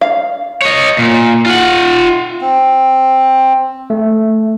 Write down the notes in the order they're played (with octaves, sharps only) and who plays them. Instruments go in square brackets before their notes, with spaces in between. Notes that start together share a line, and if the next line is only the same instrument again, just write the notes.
[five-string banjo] F5
[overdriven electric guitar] C#5 D#5
A#2
F4 F#5
[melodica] C4
[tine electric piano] A3